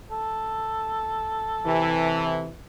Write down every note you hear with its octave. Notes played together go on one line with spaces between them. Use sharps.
A4
C3 E3